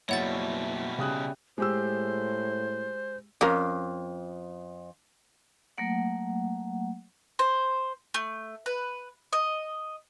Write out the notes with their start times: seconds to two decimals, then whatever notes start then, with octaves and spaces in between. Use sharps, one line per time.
0.09 F#1 B2 G3 E4 F#4 C#5 F#5 A6
0.98 C#3 G4 D#6 F#6
1.58 A2 G#3 G4 C5 E6
3.41 F2 C#4 A#4 F5
5.78 F#3 A3 A#3 F#5
7.39 C5
8.14 A3
8.66 B4
9.33 D#5